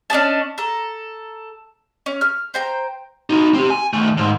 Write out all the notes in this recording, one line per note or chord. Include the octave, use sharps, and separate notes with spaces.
C#4 D4 D#5 A5
A4 A#5
C#4
F6
C5 G5 A#5
D#4 F#4
C4 G4
G#5
D#3 A3
D#2 G#2